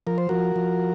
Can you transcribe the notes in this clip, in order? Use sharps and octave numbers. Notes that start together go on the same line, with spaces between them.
F3 A#4
C5
F3 F#4 A#4
F3